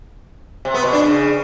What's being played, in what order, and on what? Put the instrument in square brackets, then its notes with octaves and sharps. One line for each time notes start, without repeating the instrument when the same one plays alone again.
[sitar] C3
B3
B2
D4
C#3